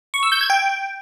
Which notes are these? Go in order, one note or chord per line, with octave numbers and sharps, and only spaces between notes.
C#6
E6
G6
G#6
G5